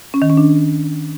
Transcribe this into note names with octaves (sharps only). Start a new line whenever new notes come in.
C#4
D#3
C#4
D4